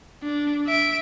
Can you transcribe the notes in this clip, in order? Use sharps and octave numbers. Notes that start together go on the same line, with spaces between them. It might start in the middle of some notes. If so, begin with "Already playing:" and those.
D4
E5 D7